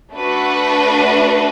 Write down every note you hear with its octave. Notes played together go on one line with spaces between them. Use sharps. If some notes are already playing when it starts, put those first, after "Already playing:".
A3 D4 F#4 B4